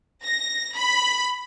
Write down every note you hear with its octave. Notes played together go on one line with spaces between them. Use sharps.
A#6
B5